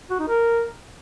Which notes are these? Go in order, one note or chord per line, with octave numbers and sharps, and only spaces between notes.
F#4
D#4
A#4